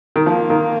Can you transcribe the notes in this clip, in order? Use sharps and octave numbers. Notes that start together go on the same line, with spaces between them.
D#3
F3 A#3
D#3